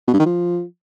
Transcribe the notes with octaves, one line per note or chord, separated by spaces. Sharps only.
B2
G2
D#3
F3